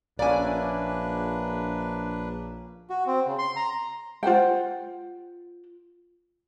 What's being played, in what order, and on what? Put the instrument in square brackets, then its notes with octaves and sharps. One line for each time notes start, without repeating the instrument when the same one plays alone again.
[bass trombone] A#1 [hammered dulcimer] A#3 C#4 E5 [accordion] D4 B4 [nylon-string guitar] D5 G#5
[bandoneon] F#4
C4
C#3
C6
A#5
[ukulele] F4 C5 F#5 G5